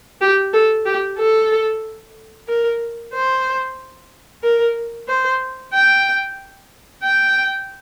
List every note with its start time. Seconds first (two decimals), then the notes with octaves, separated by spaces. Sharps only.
0.21 G4
0.53 A4
0.86 G4
1.18 A4
2.48 A#4
3.14 C5
4.43 A#4
5.08 C5
5.73 G5
7.03 G5